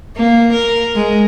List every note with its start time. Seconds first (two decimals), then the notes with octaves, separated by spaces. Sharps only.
0.17 A#3
0.53 A#4
0.96 G#3